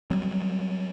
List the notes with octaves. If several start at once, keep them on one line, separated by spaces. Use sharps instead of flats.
F#3 G3 C4